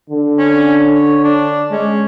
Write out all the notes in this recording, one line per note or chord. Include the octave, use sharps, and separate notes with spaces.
D3
C#4
C#5
D4
G#3 C#4